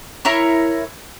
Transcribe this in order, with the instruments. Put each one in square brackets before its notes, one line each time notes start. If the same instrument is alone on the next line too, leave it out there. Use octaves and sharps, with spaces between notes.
[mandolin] E4 A#4 C#5